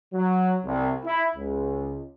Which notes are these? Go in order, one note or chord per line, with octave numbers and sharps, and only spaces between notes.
F#3
C2
E4
C#2